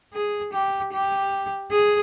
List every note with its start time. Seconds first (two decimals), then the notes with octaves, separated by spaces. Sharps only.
0.14 G#4
0.53 G4
0.93 G4
1.72 G#4